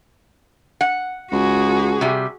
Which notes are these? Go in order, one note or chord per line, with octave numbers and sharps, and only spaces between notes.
F#5
C#2 F#4 G#4
C3 G3